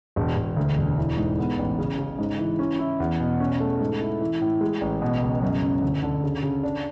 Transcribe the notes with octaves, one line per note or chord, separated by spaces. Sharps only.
E1
E1
D2
E1
E3
G#2
B3
A1
C#3
C#3
G#2
E3
C#4
E4
E2
B2
C#4
A3
G#2
E4
E3
A2
G#3
A1
B2
C#2
F#2
C#4
D2
D3
C#3
C#3
D4